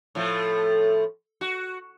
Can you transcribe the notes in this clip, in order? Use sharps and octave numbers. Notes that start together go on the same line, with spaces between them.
A2 F3 A3
F#4